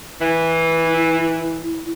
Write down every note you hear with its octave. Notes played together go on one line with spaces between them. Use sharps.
E3 E4